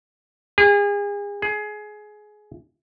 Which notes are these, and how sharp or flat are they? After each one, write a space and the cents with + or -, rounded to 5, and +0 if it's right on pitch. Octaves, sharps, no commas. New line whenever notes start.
G#4 -35
G#4 +20